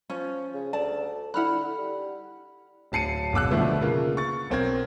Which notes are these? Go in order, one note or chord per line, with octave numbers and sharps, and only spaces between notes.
F3 C#4
C#3
D2 D5 A5
D3 E4 F#5 B5 F6 F#6
G3
D1 A5 C7 C#7 D#7
F#1 B2 D6 E6 F#6
B2 D3 F3 A3 B3
C#3 A#3 F4
C#6 A6
B1 C4 A#4 G#6